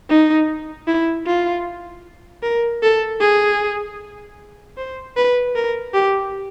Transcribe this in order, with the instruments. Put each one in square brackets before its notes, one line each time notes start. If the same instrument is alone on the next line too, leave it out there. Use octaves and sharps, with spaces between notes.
[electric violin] D#4
E4
F4
A#4
A4
G#4
C5
B4
A#4
G4